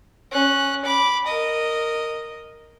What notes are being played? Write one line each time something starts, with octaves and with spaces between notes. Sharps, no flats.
C#4 F#6
B5 D6
A#4 D#5